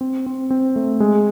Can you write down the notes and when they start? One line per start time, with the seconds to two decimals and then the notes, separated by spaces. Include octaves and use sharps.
0.01 C4
0.26 C4
0.50 C4
0.76 A3
1.00 G#3